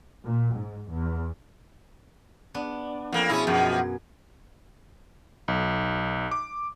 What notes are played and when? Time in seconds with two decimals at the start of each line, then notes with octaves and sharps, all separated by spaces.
0.24 A#2
0.57 G#2
0.93 E2
2.54 B3 D4
3.12 F2 A#3
3.29 B2 F3 C#4 E4 G#4
3.47 F#2 B2 F3
5.48 B1
6.31 D6